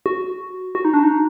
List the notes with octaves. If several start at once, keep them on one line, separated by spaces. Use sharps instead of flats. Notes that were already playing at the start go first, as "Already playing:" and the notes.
F#4
F#4
D#4
D4
D#4